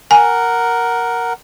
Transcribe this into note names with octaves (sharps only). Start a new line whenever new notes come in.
A#4 F#5 G#5